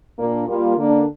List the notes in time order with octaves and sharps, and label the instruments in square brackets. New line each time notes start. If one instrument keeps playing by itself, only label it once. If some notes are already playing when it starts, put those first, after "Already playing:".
[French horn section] A#2 A#3 D4
G3 A#3 F4
D3 A#3 D4